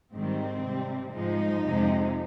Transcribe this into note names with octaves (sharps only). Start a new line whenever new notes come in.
G#2 D#3 G3 C4
C3 G3
G#2 F3 G#3 D#4
F2 C3 F3 G#3